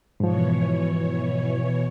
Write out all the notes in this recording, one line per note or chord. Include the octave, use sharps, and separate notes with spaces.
G#2 B2 E3 F3 C#5